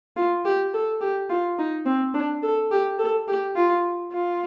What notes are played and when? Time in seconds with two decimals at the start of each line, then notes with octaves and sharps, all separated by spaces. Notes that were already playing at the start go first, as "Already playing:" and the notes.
0.16 F4
0.45 G4
0.74 A4
1.01 G4
1.30 F4
1.59 D#4
1.86 C4
2.14 D4
2.43 A4
2.71 G4
2.99 A4
3.28 G4
3.56 F4
4.12 F4